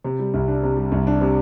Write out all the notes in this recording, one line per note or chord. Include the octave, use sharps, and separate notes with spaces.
C3
G3
C2
D4
C3
G3
C2
D4
C3